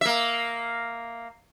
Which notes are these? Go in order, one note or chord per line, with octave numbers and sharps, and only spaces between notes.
A#3 E5